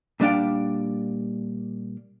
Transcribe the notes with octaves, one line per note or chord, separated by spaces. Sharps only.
A#2 G3 D4 F5 G5